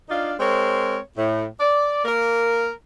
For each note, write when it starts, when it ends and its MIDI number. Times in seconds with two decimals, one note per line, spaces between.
0.09 0.33 62
0.09 0.33 63
0.09 0.33 65
0.09 0.33 74
0.09 0.33 77
0.39 0.98 56
0.39 0.98 60
0.39 0.98 70
0.39 0.98 73
1.17 1.44 45
1.60 2.02 74
2.05 2.69 58
2.05 2.69 70